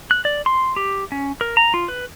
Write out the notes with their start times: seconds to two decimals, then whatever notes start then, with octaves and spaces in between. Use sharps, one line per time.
0.11 F#6
0.25 D5
0.46 C6
0.76 G4
1.12 C#4
1.41 A#4
1.57 A#5
1.74 F4
1.88 B4